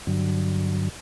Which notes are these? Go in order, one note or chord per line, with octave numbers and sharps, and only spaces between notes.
G2 D3 F#3